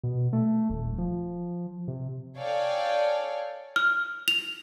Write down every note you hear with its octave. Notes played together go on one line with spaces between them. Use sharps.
B2
A3
D#1
F3
C3
A4 C#5 D5 F5 G5 G#5
F6
F7